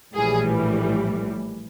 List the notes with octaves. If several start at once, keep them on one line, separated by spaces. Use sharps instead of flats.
A#1 A2 E3 G3 G#4